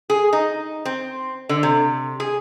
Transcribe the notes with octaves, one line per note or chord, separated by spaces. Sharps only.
G#4
D#4
C4
D3
C3
G#4